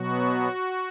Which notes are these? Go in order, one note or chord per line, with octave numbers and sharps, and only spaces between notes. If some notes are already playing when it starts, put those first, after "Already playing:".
Already playing: B2 F#3 B3 F#4